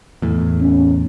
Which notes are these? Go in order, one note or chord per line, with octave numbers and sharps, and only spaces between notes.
E2 A2
C#4